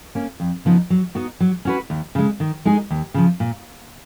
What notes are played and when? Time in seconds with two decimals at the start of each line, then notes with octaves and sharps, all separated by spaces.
0.15 A#3 C#4
0.40 F2
0.65 C#3 F3 B3 D#4
0.90 F#3
1.15 B3 D#4 F#4
1.40 F#3
1.65 C#4 F#4 B4
1.90 D#2
2.15 C#3 G#3
2.40 D#3
2.65 G#3 D#4 G#4
2.90 D#2
3.14 C#3 F3
3.40 A#2